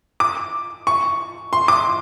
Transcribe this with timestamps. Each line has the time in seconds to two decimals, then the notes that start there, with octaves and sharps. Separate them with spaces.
0.20 D6
0.87 C#6
1.53 C6
1.68 D6